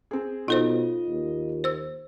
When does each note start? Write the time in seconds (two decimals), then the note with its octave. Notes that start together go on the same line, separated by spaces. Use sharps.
0.11 C4 G#4
0.48 B2 D#4 F4 A4 C5 D#5
1.09 D#2
1.64 C5 E6